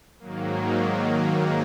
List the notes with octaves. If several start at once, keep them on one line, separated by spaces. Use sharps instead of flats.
G#2 D#3 F#3 A#3